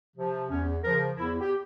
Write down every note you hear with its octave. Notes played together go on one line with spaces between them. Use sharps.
C3 F3
E2 C#4
C#3 F3 A#4
E2 E4
G4